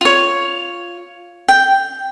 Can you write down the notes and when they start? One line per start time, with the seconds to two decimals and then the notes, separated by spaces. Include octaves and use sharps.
0.01 F4 C#5
1.48 G5